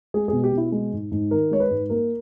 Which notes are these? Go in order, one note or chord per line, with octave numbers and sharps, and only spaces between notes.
G#3 G#4
B2 G#4
G4
B2 E4
G#3
G#2
G#2
D#3 A#4
G#3 C#5
B4
G#2
A#3 A#4